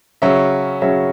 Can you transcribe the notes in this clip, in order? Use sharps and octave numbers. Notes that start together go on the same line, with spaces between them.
C#3 F#3 C#4 E5
C#3 F#3 C#4 E5